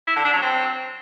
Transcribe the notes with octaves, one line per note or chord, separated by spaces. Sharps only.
E4
D3
D4
F#3
C4